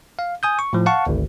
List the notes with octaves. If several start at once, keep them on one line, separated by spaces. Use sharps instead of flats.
F5
G#5 D#6 G6
C#6
A2 F3
F5 F#5 A5 C#6
G#1 D2